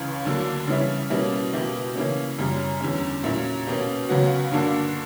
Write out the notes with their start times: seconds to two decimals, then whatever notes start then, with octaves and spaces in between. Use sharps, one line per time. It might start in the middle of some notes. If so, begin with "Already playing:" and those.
Already playing: C#2 C#3 E3
0.25 D2 D3 F#3 A#3 D4
0.68 C#3 E3 G3 C#4 E4
1.10 B2 G3 A#3 C#4 E4
1.53 B2 A#3 E4 G4
1.96 C#3 E3 A#3 C#4
2.38 F#2 C#3 G3 C#4
2.81 E2 D3 G3 C#4
3.24 A#2 F#3 C#4 E4
3.67 B2 A#3 C#4 G4
4.09 C#2 C#3 F#3 B3 F#4
4.51 G2 D3 A#3 D4 F#4